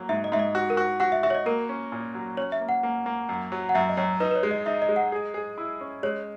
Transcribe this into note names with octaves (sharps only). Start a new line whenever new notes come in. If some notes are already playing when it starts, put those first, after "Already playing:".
Already playing: F#3 A#3
G#2 E5
D#5
G#2 E5
D#5
F#4
A#4
F#4
F#4 F#5
E5
F#4 E5
C#5
D#5
A#3 A#4
C#4
A#2
F#3
C#4 C#5
E5
A#3
F#5
A#3
A#3
F#2
F#3
F#5
F#2 E5
D#5
F#2 C#5
D#4 B4
B4
C#5
G#3
D#5
D#4 E5
D#5
G#3
F#5
G#4
G#4
E4
C#4
G#3 C#5